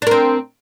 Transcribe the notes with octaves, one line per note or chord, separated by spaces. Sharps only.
C4 D4 A#4